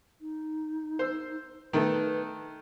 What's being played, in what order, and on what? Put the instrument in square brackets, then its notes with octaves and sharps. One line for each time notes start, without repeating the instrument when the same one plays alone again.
[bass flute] D#4
[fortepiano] C5 E6
[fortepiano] D#3 A3 A4 [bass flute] B4